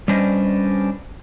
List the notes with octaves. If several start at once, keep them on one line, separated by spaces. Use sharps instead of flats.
G3 C#4 D4 B4 C5 D#5